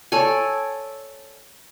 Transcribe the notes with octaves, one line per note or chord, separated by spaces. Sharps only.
A4 C#5 D5 G#5